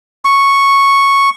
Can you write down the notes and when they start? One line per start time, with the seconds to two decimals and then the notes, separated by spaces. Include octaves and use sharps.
0.25 C#6